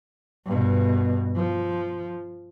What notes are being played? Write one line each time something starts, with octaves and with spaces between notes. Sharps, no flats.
G2 B2
F3